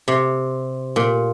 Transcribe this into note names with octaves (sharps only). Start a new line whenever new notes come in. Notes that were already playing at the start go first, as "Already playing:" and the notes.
C3
A#2